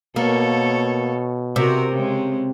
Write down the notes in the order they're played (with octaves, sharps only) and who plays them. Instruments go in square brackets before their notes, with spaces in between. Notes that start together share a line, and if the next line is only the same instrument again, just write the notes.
[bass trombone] B2 [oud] A#3 [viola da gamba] A4 C#5
[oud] C3 [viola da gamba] F#4 A#4
[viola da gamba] C#3 G#3